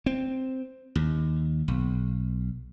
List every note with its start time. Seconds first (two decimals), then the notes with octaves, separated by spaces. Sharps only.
0.06 C4
0.95 D#2
1.68 B1